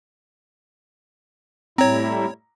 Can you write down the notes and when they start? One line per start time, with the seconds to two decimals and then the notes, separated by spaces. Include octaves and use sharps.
1.78 A2 G3 C4 E4 C#5 A#5